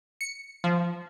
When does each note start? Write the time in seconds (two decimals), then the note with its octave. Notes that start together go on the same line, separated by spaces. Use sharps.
0.21 C#7
0.64 F3